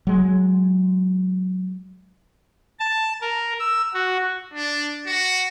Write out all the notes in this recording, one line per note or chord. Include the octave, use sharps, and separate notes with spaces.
F#3 G#3
A5
A#4
E6
F#4
D4
F#4